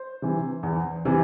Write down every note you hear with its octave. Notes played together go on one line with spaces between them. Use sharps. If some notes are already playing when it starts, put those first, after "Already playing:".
Already playing: C5
C3 E3
E2
C3 E3